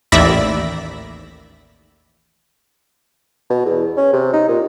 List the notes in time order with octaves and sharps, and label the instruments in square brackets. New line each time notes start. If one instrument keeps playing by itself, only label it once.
[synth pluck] A1 D#2 D5 E5 B5 A#6
[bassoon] B2
E2
C#4
C3
D#4
A#2